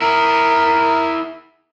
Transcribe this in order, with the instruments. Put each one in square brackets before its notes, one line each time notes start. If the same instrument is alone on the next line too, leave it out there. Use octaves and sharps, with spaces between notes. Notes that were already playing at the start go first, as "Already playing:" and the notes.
[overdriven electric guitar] E4 G#4 [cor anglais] A#4